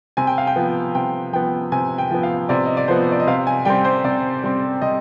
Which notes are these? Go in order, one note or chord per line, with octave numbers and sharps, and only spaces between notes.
C3 G#5
G5
F5
G5
F3 B3
C3 G5
F3 B3 G5
C3 G#5
G5
F3 B3
F5
C3 D5
D#5
D5
F3 B3 C5
D5
D#5
C3 F5
G#5
G3 C4 G5
C5
C3 D5
G3 C4
C3 D#5